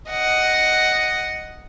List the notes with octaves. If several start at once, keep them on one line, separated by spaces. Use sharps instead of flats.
D#5 F#5